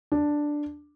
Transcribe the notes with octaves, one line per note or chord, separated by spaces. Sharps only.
D4